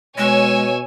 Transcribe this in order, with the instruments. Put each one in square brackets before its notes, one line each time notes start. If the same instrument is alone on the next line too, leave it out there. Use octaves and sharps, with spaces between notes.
[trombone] B2 [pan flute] G#3 [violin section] C#5 G#5 [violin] C#6 E6